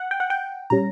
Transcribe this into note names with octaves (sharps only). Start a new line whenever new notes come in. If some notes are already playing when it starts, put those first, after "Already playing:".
Already playing: F#5
G5
F#5
G5
A#2 G3 C#4 A#5